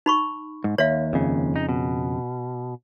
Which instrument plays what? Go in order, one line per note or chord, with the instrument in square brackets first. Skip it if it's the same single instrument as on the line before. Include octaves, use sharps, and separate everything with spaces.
[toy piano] D#4 B5 C#6
[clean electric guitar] G#2
[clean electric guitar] D#2 [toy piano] C#5 E5 F5
[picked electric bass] F2 C#3
[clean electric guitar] D#4
B2